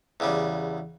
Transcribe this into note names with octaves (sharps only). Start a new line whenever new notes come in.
E2 C#3 G3